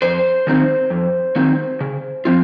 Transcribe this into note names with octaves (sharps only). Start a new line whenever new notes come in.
F2 C5
D#3 F#3 C4 D#4
F2
D#3 F#3 C4 D#4
C#3
F3 C4 F4